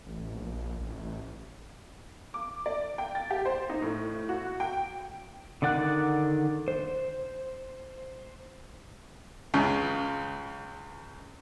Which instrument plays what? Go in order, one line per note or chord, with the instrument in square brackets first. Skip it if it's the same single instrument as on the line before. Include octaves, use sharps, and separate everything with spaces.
[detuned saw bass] A1
A#1
A1
[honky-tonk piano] D6
D5
G5
A6
G4
C5
D#4
A2
F#4
G5
[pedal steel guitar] D3 D#3 D5 F#5 F#6
C5
[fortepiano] C#2 C#3